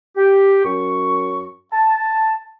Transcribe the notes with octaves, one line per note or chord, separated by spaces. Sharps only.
G4
F#2 C#6
A5